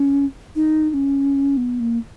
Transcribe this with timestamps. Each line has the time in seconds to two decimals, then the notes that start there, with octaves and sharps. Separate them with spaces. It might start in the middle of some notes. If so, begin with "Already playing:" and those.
Already playing: C#4
0.55 D#4
0.90 D#4
0.94 C#4
1.57 B3
1.80 A#3